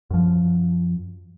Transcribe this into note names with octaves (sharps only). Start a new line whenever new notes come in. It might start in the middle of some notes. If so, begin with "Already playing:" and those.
F#2 F3